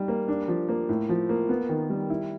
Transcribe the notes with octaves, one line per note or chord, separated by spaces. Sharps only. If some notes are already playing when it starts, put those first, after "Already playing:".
Already playing: G3 D#4
A#3
D4
F3
A#3
A2
F3
A#3
B3
D#3
G3
E4